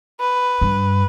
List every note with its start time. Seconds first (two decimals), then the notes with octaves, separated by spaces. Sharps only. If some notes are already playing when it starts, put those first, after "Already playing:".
0.20 B4
0.61 G2